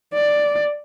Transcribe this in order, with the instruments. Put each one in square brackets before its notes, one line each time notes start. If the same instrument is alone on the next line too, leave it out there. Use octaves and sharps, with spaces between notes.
[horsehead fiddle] D5